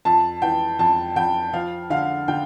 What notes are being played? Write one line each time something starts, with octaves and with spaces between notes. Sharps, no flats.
F2 A5
E3 G5
F2 A5
F2 G5
F3 F5
D3 F5
D3 G5